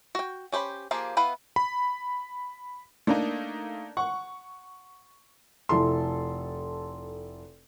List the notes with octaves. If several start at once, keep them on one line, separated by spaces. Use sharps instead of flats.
F#4 G5
C#4 G4 C5 B5
F3 A#3 G4 G#4
B3 E4 B4 F5
B5
A3 A#3 D4 D#4
F#5 C#6
F1 E4 A4 C6